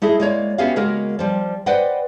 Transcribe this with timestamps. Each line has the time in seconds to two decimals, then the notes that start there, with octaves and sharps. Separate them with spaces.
0.02 A3 E4 G#4 D#5
0.20 G#3 A#3 C#5 D5
0.58 B3 C#4 F#4 G4 E5 F5
0.76 C#3 G#3 A#3 F#4 A#4
1.19 F3 G3
1.66 B4 C5 D5 D#5 F#5 G5